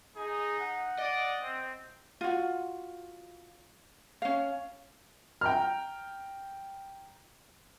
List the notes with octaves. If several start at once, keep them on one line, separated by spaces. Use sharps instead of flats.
D#4 G#4
F#5
D5 D#5
C4
F4 F#4
C#4 F5
G5 A#5 F6